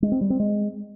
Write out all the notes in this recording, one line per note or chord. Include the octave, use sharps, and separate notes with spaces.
G#3
C4
G3
C4
G#3